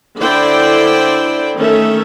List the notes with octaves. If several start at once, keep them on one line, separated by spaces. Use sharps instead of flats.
D3 E4 C5 D5 G5
D#3 A3 C#4 A4 E5